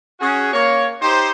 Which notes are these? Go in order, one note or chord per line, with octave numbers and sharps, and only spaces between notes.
C#4 F#4 G#4
A#3 C#5
D#4 G4 C5